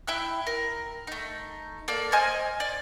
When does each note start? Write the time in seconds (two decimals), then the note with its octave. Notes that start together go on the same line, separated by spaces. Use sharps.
0.08 E4 E5 G5 F#6
0.47 A#4
1.07 A3 D#4
1.88 A#3 A4 D5
2.12 C5 D#5 G#5 F6
2.60 D5